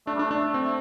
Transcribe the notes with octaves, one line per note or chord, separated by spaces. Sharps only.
A3 D4
G3
A3 D4
D4
C4